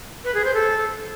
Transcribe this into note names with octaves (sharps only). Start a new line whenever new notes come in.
B4
G#4
C5
A4